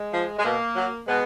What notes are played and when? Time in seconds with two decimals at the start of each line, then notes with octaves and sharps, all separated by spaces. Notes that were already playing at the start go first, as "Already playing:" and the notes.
Already playing: G#3
0.13 F3
0.38 G#3
0.44 B2 A#3
0.76 F#3
1.08 B2 G#3 B3